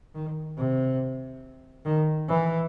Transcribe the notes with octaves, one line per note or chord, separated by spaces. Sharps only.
D#3
C3
D#3
E3